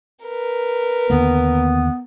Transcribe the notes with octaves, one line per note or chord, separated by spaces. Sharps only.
A#4 B4
D#2 D3 A#3 B3